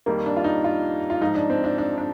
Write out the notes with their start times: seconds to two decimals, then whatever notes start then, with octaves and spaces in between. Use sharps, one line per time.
0.06 F2 D#3 G3 A#3
0.26 D4
0.37 F4
0.44 D#4
0.64 F4
1.10 F4
1.21 G#2 F3 D#4
1.35 D4
1.50 C4
1.64 D4
1.78 D4
1.98 D4